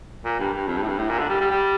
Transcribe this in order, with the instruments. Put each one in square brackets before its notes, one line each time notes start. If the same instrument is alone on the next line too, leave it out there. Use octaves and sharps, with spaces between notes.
[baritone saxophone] A#2
G2
G2
F2
G2
A2
G2
A2
A#2
D3
G3
G3
G3